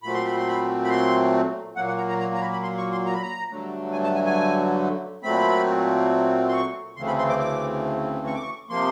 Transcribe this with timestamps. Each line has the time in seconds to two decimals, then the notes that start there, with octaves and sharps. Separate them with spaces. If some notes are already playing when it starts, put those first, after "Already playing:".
0.03 A#2 F#3 A3 C4 B5
0.14 C6
0.25 B5
0.37 C6
0.48 B5
0.84 B5
0.90 C6
1.76 A#2 F#3 A#3 F#5
1.88 F#5
1.97 A#5
2.09 A#5
2.19 A#5
2.34 A#5
2.41 B5
2.53 B5
2.63 C6
2.78 C#6
2.92 C6
3.06 A#5
3.14 B5
3.23 A#5
3.49 G2 D3 F#3 A3
3.92 G#5
4.03 A5
4.15 G#5
4.26 G#5
5.23 A#2 F#3 A3 C4 B5
6.49 C6
6.53 C#6
6.96 D2 C#3 E3 A3 C4 C6
7.07 B5
7.19 C6
7.30 D6
7.40 D6
8.27 C#6
8.34 D6
8.42 C#6
8.70 C3 F3 A#3 C6